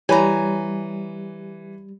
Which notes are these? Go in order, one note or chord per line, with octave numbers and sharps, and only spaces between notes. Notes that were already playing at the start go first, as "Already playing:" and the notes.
E3 G3 C#5 G#5 A#5 B5